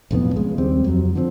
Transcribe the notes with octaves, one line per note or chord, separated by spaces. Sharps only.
B1 F2 A2 B3
C#3 G#3
D#2 G3 C4
F2 F#3
D3 F3 A3 C4